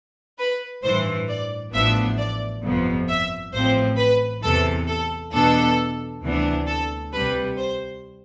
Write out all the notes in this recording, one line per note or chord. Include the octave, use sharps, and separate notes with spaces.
B4
A1 G2 E3 C5
D5
A1 A2 F3 B3 D4 E5
D5
G1 F2 C3 F3 B3
E5
A1 A2 F3 C4 C5
B4
E2 C3 E3 A4
A4
E2 B2 B3 D4 A4
D2 C3 E3 B3 D4
A4
C2 C3 G3 B4
C5